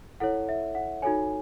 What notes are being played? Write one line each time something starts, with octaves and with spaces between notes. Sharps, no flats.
E4 A4 C#5 F#5
E5
F#5
D#4 F#4 A4 C#5 G#5